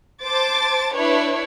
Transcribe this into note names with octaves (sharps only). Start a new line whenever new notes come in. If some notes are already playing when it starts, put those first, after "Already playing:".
C5 A5 D6 A6
D4 E4 B4 C#5